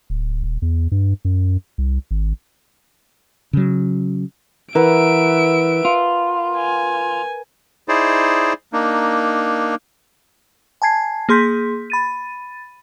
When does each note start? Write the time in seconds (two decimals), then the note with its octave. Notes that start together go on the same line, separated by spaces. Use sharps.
0.10 D1
0.43 D#1
0.62 E2
0.92 G2
1.25 F#2
1.78 C2
2.11 G#1
3.53 C#3 F#3
4.75 E3 A#4 B4 E5 F#5 D7
5.85 F4
6.57 G#5
7.88 D#4 E4 G#4 C5 D5
8.73 A#3 D4 D#4
10.82 G#5 A5 G#6 C7
11.29 A#3 G#4 C6 G6 B6
11.90 B5 A6 D#7